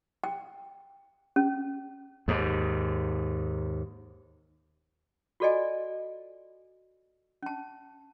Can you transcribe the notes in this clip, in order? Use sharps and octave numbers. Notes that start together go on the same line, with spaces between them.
G5
C#4
D#2 G#2
F4 F#4 A4 D5 D#5 G#5
C#4 A5